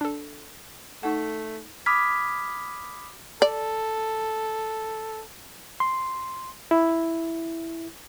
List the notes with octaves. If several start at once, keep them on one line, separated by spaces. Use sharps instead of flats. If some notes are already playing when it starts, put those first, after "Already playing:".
D4 A4
A3 D#4 F#5
B5 D6 D#6 F6 G#6 B6
A4 D5
C6
E4